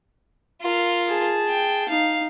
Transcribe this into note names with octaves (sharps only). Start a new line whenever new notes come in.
F4 A#4
G#4 A5
G5
D#4 F5